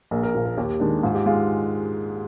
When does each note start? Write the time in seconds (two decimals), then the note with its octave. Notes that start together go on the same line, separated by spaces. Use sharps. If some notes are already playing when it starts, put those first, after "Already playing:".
0.11 A#1 A#4
0.23 A#4
0.35 A#2 F3
0.45 A#4
0.57 D#2 G4
0.80 D#3 G#3 D4
1.03 G#2 F4
1.15 G4
1.26 G#3 F4